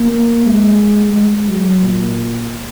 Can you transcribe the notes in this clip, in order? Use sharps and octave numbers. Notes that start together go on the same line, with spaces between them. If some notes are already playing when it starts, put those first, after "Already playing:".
Already playing: A#3
G#3
G#3
F#3
A#2